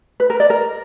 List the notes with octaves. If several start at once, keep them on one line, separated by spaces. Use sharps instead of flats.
B4
A#4
D5
A#4